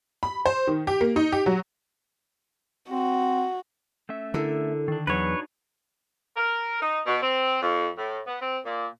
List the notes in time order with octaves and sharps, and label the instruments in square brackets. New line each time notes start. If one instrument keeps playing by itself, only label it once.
[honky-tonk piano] B5
C5
D#3
G4
A#3
D#4
G4
F#3
[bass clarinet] C4 [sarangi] F#4
[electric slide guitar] A3 C#4 E5
[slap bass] D3 [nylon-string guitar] E4 A4 A#4
[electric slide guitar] D#3 D4
[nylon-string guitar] E2 F#3 [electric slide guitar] D4 D#4 F#4 [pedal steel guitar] B4 C#5
[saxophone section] A#4
D#4
B2
C4
F2
A2
B3
C4
A#2